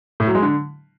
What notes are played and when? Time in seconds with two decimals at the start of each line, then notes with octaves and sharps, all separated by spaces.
0.20 A2
0.27 F#3
0.35 G#3
0.42 D3